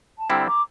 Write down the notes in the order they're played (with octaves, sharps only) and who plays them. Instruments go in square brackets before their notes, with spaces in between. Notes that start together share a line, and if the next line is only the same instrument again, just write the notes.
[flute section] A5
[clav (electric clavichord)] D3 G3 C4 E4 [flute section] G5 A#5
[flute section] A#5 D6